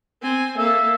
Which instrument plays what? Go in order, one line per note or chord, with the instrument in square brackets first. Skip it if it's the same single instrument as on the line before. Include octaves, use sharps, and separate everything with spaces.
[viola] C4 G#5
[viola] A#3 A4 [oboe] E5